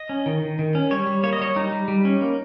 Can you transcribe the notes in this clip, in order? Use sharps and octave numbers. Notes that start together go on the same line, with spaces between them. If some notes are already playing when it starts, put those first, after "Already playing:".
Already playing: D#5
C#4
D#3
D#3
D#3
C#4
G3 C#5
G3
A#3 C#5
D#5
G3 C#5
G3 D#4
G3
G3
C#4
A#3